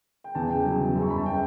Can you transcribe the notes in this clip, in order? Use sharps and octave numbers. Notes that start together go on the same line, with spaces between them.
G5
E2 A5
C#3 G5
F#3
E2
F#2
C#6
F#2 B5
A5
G5